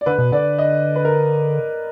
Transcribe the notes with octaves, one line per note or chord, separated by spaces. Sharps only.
D5
D3 B4
B2
D3 D5
D#5
B4
A#4